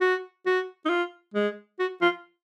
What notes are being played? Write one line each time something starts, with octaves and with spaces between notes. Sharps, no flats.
F#4
F#4
D#4
F4
G#3
F#4
F4